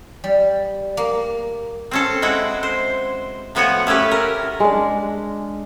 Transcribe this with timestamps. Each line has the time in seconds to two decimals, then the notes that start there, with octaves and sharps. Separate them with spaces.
0.24 G3
0.97 A#3
1.91 C4 C#4 A4
2.22 G#3 E4 F#4 G5
2.63 C5
3.55 A2 F3 B3 F#4 C#5 G#5
3.87 A3 C#4 E4 G4 B4
4.11 A#4
4.60 G#3 D4